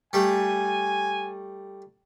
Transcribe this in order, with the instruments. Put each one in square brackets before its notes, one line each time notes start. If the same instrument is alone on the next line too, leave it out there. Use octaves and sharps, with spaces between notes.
[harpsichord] G3 A3 [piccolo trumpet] G#5